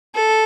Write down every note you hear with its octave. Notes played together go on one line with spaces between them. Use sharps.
A4